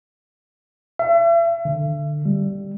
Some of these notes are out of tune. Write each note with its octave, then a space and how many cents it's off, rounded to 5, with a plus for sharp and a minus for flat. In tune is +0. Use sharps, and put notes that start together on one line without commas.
E5 +40
D3 +15
G3 +0